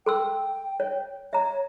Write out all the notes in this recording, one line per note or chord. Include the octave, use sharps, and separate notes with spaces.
A4 G5 C6 E6
C#5
C#5 E5 A#5